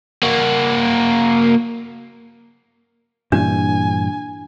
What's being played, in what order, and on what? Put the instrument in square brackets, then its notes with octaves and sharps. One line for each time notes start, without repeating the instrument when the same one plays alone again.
[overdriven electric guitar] A#3 F#4
[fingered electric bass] G2 A#2 E3 [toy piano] D4 [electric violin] G#5